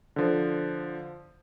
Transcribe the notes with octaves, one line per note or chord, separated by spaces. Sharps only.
D3 F3